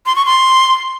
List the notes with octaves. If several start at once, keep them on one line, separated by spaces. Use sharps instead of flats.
C6
C#6
C6